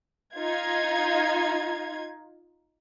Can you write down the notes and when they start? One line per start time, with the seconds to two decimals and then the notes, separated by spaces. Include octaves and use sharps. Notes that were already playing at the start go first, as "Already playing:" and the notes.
0.35 D#4 F4 G#6